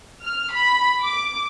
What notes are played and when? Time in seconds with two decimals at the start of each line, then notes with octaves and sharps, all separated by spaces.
0.24 F6
0.53 B5
1.01 D6